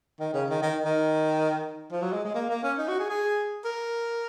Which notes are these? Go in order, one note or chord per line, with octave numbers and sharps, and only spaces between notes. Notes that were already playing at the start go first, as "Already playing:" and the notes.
D#3
C#3
D#3
D#3
D#3
F3
F#3
G#3
G#3
A#3
A#3
C#4
D#4
F#4
G#4
G#4
A#4